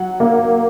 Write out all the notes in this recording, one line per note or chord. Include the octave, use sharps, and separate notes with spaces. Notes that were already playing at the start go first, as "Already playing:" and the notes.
Already playing: F#3 F#5
A#3